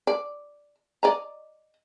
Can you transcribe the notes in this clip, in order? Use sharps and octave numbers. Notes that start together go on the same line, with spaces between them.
D5
D5 D#5 A#5